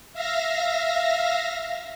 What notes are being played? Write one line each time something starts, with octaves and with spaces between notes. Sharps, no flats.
E5 F5 A#6